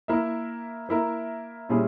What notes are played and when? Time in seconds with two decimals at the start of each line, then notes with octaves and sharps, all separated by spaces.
0.08 A#3 E4 A#4 E5
0.89 A#3 E4 A#4 E5
1.69 A#2 G3 C#4 E4 G#4